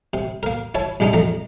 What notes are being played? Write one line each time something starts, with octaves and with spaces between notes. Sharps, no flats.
C3
A#3 A#4
E4 C#5 A5
G#2 C3 G#3 D4 D#4
F2 A3 A#5